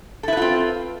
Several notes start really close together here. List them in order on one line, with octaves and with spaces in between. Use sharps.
A4 E4 B4 F4 C4